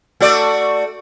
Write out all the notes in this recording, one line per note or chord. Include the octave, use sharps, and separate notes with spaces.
A3 F#4 D5